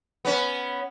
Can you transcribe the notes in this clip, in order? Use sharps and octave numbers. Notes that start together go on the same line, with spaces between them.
B3 C#4